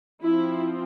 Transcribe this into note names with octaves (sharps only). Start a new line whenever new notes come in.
F3 C4 E4